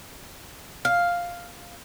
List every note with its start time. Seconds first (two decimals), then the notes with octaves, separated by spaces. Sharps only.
0.85 F5